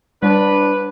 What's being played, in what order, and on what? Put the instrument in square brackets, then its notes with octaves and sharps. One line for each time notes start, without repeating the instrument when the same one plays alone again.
[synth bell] G3 [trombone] D4 [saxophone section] B4